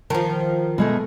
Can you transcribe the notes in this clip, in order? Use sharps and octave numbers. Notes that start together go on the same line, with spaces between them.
D#3 F3 A5
B2 G#3 A3